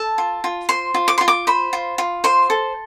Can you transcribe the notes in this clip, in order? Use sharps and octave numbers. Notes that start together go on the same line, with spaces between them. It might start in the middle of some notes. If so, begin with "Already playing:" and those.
Already playing: A4 A5
F4
F4
C5 C6
F4
D6
F4 C6
D6
C5 B5
F4
F4
C5 C6
A4